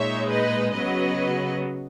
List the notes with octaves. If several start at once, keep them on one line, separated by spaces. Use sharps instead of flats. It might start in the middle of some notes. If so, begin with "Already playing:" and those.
Already playing: A#2 G#3 D#4 C#5 E5
B4 D#5
C#3 F#3 B3 B4 D#5